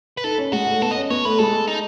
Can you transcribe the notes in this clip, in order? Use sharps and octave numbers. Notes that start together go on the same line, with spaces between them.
B4
D#4 A4
C#4
G#3 F#4
A3
B3 A4
D#5
C#4
B3 C#5
A3 B4
G#3 A4
D#4